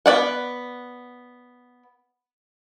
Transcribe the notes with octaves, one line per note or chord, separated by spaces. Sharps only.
B3 D5 F#5